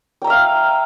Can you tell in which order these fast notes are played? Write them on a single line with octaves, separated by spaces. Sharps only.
G5 A#5 E5 F5